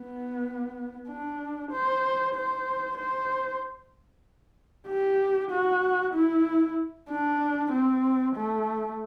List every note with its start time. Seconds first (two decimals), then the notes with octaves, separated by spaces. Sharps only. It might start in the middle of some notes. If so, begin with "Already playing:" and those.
Already playing: B3
1.08 D4
1.72 C5
2.35 C5
2.98 C5
4.88 G4
5.51 F#4
6.14 E4
7.09 D4
7.72 C4
8.36 A3